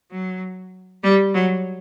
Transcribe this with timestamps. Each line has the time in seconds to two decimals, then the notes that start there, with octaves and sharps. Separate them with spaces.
0.11 F#3
1.03 G3
1.34 F#3